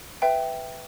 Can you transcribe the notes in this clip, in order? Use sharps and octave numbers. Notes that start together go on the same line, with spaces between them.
B4 E5 G5